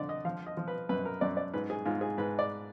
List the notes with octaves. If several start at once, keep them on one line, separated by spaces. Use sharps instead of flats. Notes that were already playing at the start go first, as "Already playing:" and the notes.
Already playing: F2 D3 D5
D#5
F3 F5
D#5
F3
B4
F#2 B4
A#4
F#2 D5
D5
G#2 B4
G#4
G#2 F4
G#4
G#2 B4
D5